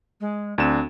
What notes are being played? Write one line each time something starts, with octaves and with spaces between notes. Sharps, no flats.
G#3
D2 C4 D4 E7